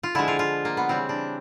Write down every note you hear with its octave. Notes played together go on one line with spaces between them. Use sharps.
F4
D3 F3 G#3 E4
F4
F4
A#3
B3
C#3 E3 G3 C4
D4